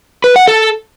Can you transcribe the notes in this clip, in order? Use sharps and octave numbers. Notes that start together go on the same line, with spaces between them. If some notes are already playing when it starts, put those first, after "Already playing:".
B4
F#5
A4